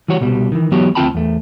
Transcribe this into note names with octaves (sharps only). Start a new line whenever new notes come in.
E3 G3 F#4 C#5
C2 B2 G3
D#3 E3
E3 F#3 B3 F#4 G4 C#5
D2 C4 F4 G5 A5 B5
E2 A3